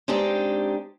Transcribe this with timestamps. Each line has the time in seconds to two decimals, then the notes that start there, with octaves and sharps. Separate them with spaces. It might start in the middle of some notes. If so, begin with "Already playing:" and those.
0.08 G#3 C4 D4 D#4 G4